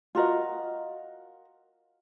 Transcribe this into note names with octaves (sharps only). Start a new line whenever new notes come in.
F4 F#4 A#4 D#5